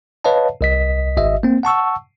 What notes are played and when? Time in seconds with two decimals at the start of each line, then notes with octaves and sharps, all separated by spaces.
0.24 B4 C#5 D#5 F5 A5
0.61 C2 D#5 B6
1.17 G#1 D#5 E5
1.43 A#3 C4
1.63 F#5 A5 C#6 E6